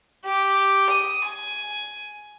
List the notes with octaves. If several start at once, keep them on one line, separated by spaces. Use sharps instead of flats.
G4
D#6
G#5